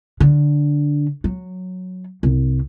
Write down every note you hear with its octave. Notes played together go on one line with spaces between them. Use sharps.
D3
F#3
C2